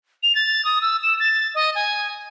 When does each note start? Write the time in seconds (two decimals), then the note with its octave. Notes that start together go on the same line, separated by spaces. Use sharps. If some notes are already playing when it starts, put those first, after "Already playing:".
0.23 F7
0.35 A6
0.65 D#6
0.82 E6
1.03 E7
1.20 A6
1.55 D#5
1.75 G#5